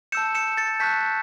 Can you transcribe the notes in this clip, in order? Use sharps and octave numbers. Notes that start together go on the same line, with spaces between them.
A5 E6 G6 C#7 E7
C#7 E7
A6 C#7
A5 C#6 F#6 G6 B6